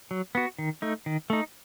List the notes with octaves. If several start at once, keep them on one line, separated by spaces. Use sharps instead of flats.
F#3
B3 F#4
D#3
A3 D#4
D#3
A3 D#4